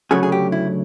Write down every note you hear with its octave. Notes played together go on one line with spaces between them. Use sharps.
D2 C#3 F#3 A3 G#4
G#4
G4
E4